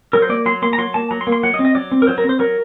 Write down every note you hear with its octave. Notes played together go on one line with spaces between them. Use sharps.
F#3 A#4
C5
A#3 D5
F#3 C6
A#3 C6
A#5
F#3 C6
A#3 A5
F#3 A#5
C6
A#3
C6
F#3 F#5
D#5
C4
D#5
F#3 D5
C4
A#4
F#3 C5
A#4
C4
C5
F#3 A#4